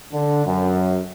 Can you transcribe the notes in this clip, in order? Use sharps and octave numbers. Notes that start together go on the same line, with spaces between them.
D3
F#2